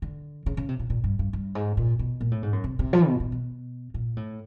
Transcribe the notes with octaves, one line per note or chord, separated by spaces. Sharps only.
D3
C#3
C#3
C3
A#2
A#2
G2
G2
G2
G#2
A#2
B2
A#2
A2
G#2
F#2
C3
C3
F3
B2
A#2
B2
A#2
A2